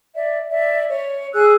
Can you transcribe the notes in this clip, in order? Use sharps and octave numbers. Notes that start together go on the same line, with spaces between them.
D5 E5
D5 E5
C#5
G#4 E6 F#6